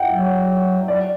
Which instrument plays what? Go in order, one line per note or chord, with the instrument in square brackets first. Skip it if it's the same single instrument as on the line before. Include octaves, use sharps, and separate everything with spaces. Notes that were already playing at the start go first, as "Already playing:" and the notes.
Already playing: [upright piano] E5 F#5 G5
[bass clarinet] F#3
[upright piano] D5